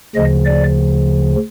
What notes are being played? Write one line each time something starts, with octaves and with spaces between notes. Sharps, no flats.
D2 C#3 F3 D#5
D5